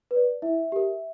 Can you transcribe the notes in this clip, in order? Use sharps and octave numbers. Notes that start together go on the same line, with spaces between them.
B4
D5
E4 E5
G4 A#4